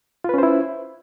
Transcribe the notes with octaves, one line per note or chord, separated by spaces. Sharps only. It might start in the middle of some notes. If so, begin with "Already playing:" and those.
C#4 E4 F4 B4 C5